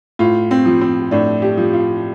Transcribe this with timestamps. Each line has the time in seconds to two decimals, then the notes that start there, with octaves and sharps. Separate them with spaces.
0.19 A2 F4
0.51 C4
0.65 F3
0.81 C4
1.11 A2 D4
1.42 G4
1.57 F3
1.73 F4